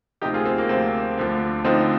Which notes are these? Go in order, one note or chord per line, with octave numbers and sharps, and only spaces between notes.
D2 C3 F3 D#4 G4
F4 G#4
C4
A#3
D2 C3 F3 C4
D2 D3 F3
D2 D3 F3 C4 D#4